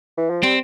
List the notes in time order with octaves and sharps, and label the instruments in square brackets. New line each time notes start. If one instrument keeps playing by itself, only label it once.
[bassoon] E3
F3
[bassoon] G3 [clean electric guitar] C4